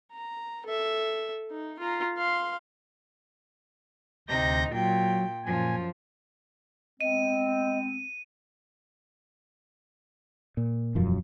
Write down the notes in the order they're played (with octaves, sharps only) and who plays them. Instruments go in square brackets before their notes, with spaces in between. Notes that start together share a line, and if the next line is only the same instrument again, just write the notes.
[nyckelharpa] A#5
A4 E5
D#4
F4 A#5
F5 C6
[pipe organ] D2 G6 A#6 [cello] C3 D#4
[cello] A#2 G5 [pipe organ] F#3
[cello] F#2 F3 [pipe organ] A#2 G#5
[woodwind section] G#3 B3 C4 [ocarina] D#5 [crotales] D#7
[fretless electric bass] A#2
E1 F#2 F3